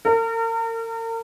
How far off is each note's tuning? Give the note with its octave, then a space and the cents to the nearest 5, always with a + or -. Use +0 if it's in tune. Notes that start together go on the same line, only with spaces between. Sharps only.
A#4 -40